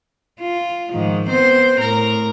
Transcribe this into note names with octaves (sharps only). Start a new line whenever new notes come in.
F4
G#2 D#3 F3
B3 C4 C5
A2 A#4